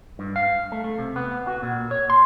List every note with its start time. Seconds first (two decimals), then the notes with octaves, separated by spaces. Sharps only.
0.19 G2
0.36 F5
0.72 A3
0.84 A3
0.98 C3
1.16 B3
1.47 F#4
1.62 A#2
1.91 C#5
2.10 C6